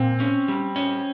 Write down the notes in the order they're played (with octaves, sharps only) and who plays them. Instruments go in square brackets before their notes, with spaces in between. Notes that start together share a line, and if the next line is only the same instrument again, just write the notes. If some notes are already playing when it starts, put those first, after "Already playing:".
Already playing: [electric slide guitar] A#2 [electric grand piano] C4
[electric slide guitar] C#4
G3
C#4